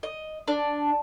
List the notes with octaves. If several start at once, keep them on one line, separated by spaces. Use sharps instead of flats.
D#5
D4